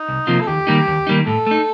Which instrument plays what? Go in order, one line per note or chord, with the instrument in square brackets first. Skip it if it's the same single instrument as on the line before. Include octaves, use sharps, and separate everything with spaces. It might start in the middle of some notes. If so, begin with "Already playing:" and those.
Already playing: [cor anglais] D#4
[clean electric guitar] C2
C3 F3 A#3 F4
[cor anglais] A4
[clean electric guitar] D#2 [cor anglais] G4
[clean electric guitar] D#3 G3 A#3 D#4
D#2
D#3 G3 A#3 D#4
[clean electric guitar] A2 [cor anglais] A4
[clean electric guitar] A3 D#4